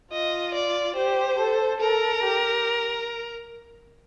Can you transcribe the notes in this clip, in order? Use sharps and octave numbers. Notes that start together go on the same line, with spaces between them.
F4 D#5
D5
G4 C5
A4
A4 A#4
G4